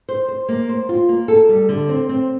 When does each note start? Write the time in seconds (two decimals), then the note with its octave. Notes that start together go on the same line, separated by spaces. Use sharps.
0.09 C5
0.28 C5
0.49 A#3
0.69 C5
0.89 F4
1.09 A#3
1.28 A4
1.49 G3
1.69 D3
1.89 C4
2.09 C4